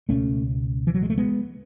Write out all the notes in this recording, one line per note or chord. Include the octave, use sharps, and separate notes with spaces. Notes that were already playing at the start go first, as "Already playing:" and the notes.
C#2 B2 A3 C#4
E3
F#3
G#3
A3
G#3 B3